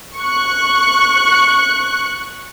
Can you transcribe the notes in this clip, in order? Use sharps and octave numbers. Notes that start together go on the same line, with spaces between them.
C#6 F#6